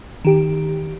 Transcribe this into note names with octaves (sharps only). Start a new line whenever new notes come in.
D#3 G4